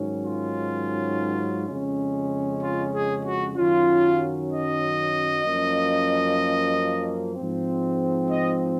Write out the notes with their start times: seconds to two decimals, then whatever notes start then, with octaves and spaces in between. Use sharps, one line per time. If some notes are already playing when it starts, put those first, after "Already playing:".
Already playing: G#2 D#3 F#3 C#4
0.24 F4
1.66 F2 C#3 G#3 C#4
2.61 F4
2.93 G#4
3.25 F#4
3.56 F#2 D#3 F#3 C#4 F4
4.51 D#5
5.46 F#2 F3 A#3 C#4
7.35 G#2 F3 C4
8.29 D#5